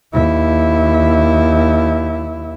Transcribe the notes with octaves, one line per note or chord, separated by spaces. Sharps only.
D#2 E4